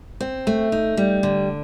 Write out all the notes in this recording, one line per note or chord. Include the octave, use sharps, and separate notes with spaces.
C4
A3
D#4
G3
D3